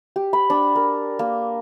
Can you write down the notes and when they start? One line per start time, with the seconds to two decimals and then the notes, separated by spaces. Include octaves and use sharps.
0.16 G4
0.33 B5
0.50 D4
0.76 A#4
1.19 A#3